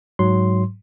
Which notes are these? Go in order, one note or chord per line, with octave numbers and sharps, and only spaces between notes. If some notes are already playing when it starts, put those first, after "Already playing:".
G#2 F#3 C6